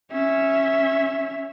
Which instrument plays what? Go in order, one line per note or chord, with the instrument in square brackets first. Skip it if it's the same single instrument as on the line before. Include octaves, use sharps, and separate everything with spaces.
[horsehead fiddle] C#4 E5